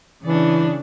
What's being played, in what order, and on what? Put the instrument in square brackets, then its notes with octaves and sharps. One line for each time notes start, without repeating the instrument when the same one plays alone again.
[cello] C#3 D4 [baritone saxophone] E3